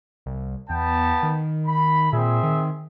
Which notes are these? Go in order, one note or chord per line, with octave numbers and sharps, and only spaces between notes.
C2
E2 B3 G5 A5
D#3
B5
A#2 C4 G#4 E5
D#3